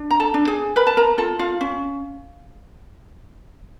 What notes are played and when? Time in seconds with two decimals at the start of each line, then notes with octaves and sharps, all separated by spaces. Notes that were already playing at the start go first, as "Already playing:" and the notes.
Already playing: D4
0.11 A#5
0.20 A4 A5
0.34 D4
0.47 G#4 G#5
0.76 A#4 B4 B5
0.87 A5
0.97 A#4 A#5
1.18 F4 A4 A5
1.39 F4 F5
1.61 C#4